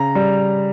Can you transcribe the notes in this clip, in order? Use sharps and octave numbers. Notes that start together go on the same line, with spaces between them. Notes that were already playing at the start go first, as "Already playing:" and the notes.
Already playing: C#3 A#5
G3